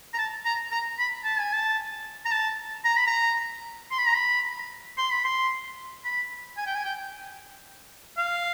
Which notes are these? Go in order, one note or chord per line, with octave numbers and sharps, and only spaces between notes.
A#5
A5
A#5
A#5
B5
A5
G#5
A5
A#5
A5
A#5
B5
A#5
C6
B5
A#5
B5
C6
B5
C6
B5
G#5
G5
G#5
G5
F5